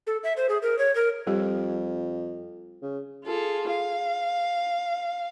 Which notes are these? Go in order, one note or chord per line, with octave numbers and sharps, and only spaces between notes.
A4
E5
C5
G#4
A#4
C#5
A#4
F2 G3 G4
C#3
F4 G#4 A4
F5